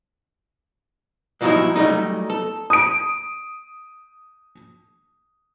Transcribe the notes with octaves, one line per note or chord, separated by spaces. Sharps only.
G2 A#2 F3 F#3 D#4 E4
F#3 G3 A3 D#4
A4
D#6 D7